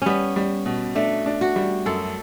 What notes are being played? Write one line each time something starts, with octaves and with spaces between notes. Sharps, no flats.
G3 B3 C#4
G3
B2
A3 D4
D4
F#4
G3
F#2 A4